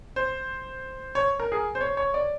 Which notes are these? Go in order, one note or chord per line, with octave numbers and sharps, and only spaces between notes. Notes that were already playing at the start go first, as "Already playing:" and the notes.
C5
C#5
A#4
G#4
C5
C#5
C#5
D5